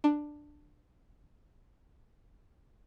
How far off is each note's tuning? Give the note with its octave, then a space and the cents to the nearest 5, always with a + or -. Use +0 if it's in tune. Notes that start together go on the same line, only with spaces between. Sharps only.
D4 +10